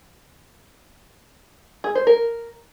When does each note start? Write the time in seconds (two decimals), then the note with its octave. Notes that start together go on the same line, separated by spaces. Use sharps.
1.84 G#4
1.95 C5
2.07 A#4